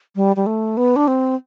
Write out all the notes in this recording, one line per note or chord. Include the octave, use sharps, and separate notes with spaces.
G3
G3
A3
B3
D4
C4